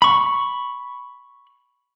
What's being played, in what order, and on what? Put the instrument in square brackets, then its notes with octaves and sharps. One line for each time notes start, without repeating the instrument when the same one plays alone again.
[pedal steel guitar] B5 C#6